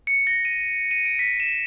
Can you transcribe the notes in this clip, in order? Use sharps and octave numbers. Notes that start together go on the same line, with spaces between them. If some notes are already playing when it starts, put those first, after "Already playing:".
C#7
A#6
D#7
D#7
D7
B6
E7